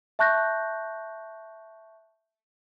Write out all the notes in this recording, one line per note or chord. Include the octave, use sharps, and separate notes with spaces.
E5 A5 C#6 F#6 G6 A#6